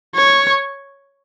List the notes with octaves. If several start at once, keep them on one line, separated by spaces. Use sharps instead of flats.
C#5